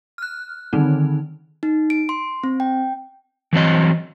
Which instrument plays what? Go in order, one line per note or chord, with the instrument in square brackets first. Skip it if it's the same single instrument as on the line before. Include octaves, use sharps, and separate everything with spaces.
[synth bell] F6 F#6
D3 D#3 G3 C4 D#4
[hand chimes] D#4
D7
C6
C4
G5
[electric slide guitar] E3 F#3 C4 D#5